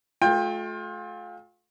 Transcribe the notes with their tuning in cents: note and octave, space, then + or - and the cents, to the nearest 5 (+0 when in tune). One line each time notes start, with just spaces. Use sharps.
A3 -35 F4 +30 G5 +25